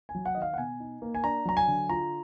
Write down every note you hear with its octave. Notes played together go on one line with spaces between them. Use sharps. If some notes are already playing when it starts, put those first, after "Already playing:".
G#5
F#3
F#5
D#3 D#5
F5
F#5
B2 G#5
D#4
A#3
G#5
D4 A#5
F#3 A#5
G#5
D3
F4 A#5